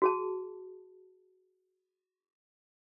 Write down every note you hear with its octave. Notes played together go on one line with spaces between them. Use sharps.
F#4 G#4 A5